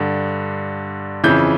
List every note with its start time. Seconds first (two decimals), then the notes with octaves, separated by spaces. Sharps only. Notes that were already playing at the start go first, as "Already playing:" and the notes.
Already playing: G2 D3
1.24 F2 C#3 E3 G6